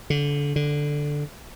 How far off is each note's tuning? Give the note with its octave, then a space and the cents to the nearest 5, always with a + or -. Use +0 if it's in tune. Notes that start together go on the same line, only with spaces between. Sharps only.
D3 -25
D3 +0